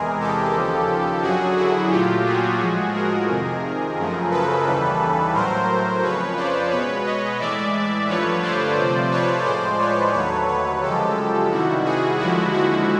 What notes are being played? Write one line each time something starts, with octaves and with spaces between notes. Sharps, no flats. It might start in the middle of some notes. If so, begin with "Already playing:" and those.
Already playing: E2 C3 E3 G#3 G#4 A#4
G4 A4
D#2 C#3 F3
F#2 D3 F#3 F#4 G#4
E4 F#4
A#2 F#3 A3 F4 G4
F#4 G#4
A2 F3 G#3
G#4 A#4
F2 C3 D#3
F#2 C#3 F3 A3
A4 B4
D#2 C#3 E3 G3
A2 F#3 A3 A#4 C5
F2 C#3 F3 B4 C#5
C5 D5
B2 G#3 B4 C#5
C#5 D#5
A2 E3 G#3 D5 E5
G2 D3 F3 A3 B4 C#5
C5 D5
C3 F3 A3
B4 C#5
A2 F3 G#3 C5 D5
B4 C#5
D#2 D3 F#3 A3 B4 C#5
B4 C#5
F#2 C#3 F3 G#3 G4 A4
C3 D#3 G3 E4 F#4
F#4 G#4
D#2 D3 F3 G#3 E4 F#4
E4 F#4